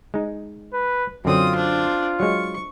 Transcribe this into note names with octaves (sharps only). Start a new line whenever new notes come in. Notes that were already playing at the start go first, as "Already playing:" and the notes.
G#3 D#4
B4
F#2 D3 F#3 C4 F4 D#6
D4 C5
F#3 G#3 C#6